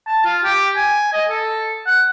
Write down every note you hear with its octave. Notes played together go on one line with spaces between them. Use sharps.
A5
F4
G4
G#5
D#5
A4
F#5